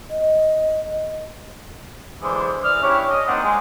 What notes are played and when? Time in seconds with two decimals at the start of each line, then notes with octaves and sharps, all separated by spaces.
0.10 D#5
2.22 D3 E3 G#3 D4 G#4 C5
2.63 E3 D5 D#6 F6
2.83 C#4 D4 E4 G4 C#5
3.10 D#5
3.27 A#3 C4 D4 D#4 C5 F#5
3.43 G#3